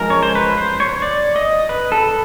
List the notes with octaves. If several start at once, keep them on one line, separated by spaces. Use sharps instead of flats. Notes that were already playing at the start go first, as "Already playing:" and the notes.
Already playing: F3 G#3 C#4 A#4
C#5
C5
B4
C5
C#5
D5
D#5
B4
A4